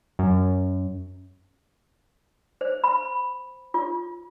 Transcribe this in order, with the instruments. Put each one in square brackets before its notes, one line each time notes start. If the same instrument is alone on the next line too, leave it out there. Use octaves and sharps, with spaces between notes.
[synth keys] F#2
[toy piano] C5
B5
F4